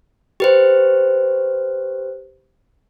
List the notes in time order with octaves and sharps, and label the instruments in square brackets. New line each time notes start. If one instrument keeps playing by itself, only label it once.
[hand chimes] G4 B4 C5